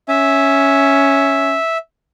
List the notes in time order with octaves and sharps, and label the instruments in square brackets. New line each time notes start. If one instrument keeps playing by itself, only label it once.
[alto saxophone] C#4 [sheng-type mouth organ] E5